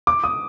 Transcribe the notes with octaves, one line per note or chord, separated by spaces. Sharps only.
D6
D#6